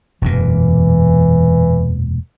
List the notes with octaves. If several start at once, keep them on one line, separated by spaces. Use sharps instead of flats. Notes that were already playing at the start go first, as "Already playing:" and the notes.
E1 F#2 A#2 E3